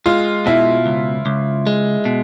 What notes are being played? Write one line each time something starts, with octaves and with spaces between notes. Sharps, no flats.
G#3 F4
B2 E4
C#2
C#2
G#3
B2